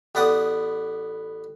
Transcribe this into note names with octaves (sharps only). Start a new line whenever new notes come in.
A1 B3 C5 D5 F#5 D#6